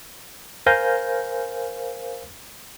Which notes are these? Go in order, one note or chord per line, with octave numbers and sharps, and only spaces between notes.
A#4 C5 F5 G#5 G6 A#6